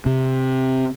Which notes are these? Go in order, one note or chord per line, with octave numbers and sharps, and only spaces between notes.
C3